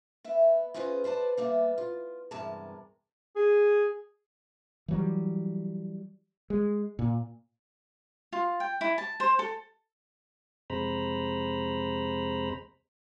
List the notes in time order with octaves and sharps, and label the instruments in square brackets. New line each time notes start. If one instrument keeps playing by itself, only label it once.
[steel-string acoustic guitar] B3 E5
C#4 F4 G#4 B4 C5 D#5
B4 C5 D5 A5
G3 A#3 B3 E5
F4
E2 G2 C3 G#3 A#4 A5
[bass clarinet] G#4
[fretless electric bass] E3 F#3 G3
G#3
A#2
[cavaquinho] F4
G5
E4
A5
C5
A4
[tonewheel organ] F2 C3 G#3 C5 A#5 B5